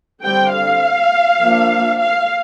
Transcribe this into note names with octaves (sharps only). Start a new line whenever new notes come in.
D3 G3 C4 G5
F5
F3 A#3 D4
F5